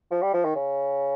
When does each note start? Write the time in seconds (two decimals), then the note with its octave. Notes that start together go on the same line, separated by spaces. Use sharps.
0.11 F3
0.22 G3
0.34 F3
0.44 D#3
0.55 C#3